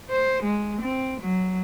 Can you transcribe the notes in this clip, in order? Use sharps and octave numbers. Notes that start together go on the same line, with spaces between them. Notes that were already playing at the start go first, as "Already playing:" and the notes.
C5
G#3
C4
F#3